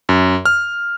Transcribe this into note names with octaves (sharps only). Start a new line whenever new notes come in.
F#2
F6